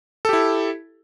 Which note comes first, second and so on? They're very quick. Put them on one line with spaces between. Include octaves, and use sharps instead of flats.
A4 G4 E4